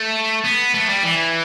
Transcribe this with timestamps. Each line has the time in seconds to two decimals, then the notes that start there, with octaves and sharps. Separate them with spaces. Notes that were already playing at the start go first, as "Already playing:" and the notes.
Already playing: A3
0.44 B3
0.74 A3
0.89 G3
1.03 E3